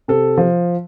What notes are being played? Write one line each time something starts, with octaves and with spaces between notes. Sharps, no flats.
C3 A4
F3